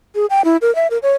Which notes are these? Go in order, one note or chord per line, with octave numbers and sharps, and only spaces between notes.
G#4
G5
E4
A#4
E5
A#4
C#5